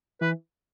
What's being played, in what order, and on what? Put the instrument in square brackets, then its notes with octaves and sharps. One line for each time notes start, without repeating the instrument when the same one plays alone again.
[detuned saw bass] E3 [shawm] B4